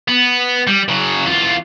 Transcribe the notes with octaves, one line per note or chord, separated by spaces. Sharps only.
B3
G3
C#3 F#3
E2 F4